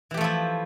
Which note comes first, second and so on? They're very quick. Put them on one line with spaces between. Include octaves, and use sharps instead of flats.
E3 G4 A3 F3 E4